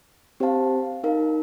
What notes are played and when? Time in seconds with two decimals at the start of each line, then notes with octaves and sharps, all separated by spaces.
0.40 C4 G4 C5 F5 A5
1.03 D#4 A#4 F5